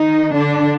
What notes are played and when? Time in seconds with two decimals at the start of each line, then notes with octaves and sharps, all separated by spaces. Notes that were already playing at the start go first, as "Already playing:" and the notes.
Already playing: D#3 D#4
0.34 D3 D4